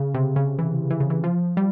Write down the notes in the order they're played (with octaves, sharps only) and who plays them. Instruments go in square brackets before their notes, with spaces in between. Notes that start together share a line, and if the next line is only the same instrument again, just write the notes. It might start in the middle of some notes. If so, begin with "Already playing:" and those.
Already playing: [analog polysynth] C#3
C3
C#3
E3
E3
C#3
E3
F3
G3